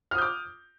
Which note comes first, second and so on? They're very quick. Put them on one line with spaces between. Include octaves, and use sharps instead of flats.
F6 D#6 G6 D6